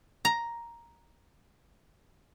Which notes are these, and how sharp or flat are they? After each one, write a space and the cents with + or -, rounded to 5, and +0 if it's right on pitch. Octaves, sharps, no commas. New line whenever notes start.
A#5 +5